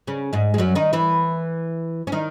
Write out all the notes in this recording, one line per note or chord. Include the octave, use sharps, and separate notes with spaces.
C#3 C#4
G#2 G#3
G#3
F#2 F#3
D#3 D#4
E3 E4
C#4
D#3 D#4